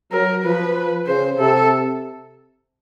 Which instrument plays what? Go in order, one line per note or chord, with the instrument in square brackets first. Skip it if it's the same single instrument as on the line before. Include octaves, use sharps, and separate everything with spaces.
[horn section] F#3 [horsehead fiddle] A#4
[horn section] F3 [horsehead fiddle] B4
[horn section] C#3 [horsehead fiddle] C5
[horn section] C3 [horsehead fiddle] A4